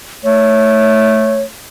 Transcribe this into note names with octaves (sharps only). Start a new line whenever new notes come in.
A3 C#5